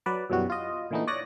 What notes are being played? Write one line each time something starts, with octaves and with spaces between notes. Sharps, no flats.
F#3 B4 D5
F#2 B2 E3 G3 F#4
F4 D#5
A#2 D3 E3 A3 B3 D#4
C#5 D5 D#6 F#6 A#6